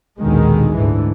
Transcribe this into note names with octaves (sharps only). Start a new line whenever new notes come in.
A#1 D#2 B2 D3 D#3 G#3
D2 G#2 D3 E3